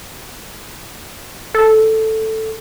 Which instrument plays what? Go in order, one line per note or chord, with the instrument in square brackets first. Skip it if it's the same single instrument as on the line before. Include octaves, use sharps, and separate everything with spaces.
[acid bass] A4